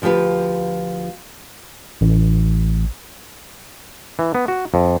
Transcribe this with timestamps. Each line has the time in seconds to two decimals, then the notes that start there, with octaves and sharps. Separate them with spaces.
0.02 D2 F3 F4 G4 B4
2.01 A1
4.19 E3
4.35 B3
4.48 F#4
4.74 F2